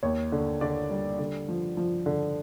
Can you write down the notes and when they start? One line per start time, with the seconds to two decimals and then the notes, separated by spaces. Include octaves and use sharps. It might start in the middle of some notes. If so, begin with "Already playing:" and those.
0.03 D#2 C#5
0.32 D3
0.61 D3 D5
0.90 G3
1.19 D3
1.48 F3
1.77 F3
2.06 D3